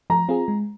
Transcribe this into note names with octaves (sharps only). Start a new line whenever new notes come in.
F3 A#5
C4 F4 G#4
G#3